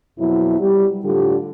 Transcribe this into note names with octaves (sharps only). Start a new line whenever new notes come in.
F2 B2 F#3 E4
G3
A2 D3 G3 F4 G4